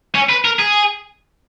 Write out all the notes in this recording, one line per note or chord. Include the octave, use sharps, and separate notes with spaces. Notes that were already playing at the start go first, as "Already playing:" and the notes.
C#4
B4
A#4
G#4